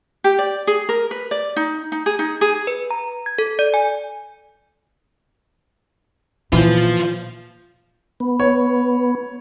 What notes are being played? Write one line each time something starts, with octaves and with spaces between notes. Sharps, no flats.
G4
D5
G#4
A#4
B4
D5
D#4
D#4
G#4
D#4
G#4
B4
A#5
G#6
A4
D5
G#5
A#2 E3 F3 F4
B3
C#5